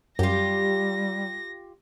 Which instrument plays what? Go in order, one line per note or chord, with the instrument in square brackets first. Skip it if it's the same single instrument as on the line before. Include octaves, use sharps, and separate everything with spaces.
[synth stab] F#2 [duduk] G3 [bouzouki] F4 G4 [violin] A#6